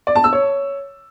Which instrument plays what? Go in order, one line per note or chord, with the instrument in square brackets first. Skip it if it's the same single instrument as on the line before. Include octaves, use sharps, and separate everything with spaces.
[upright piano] D5
A5
E6
C#5